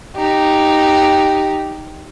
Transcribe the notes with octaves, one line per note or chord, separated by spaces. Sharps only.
D#4 G4